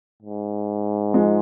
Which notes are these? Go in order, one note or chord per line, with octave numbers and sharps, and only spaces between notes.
G#2
F3 G#3